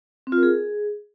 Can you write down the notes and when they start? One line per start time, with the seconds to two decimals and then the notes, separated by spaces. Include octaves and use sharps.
0.27 C4
0.32 F4
0.38 A#4
0.43 G#4